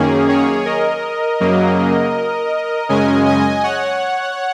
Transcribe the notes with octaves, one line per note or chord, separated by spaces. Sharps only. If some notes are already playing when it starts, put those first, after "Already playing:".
Already playing: F#2 D#3 A#3 C#4 G#4
G#4 C#5
A#4 D#5
F#2 C#3 F#3 A#3
F#2 C#3 G#3 C#4 D#5 G#5
D#5 G#5
C#5 F#5